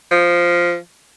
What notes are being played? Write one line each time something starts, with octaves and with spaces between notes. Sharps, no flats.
F3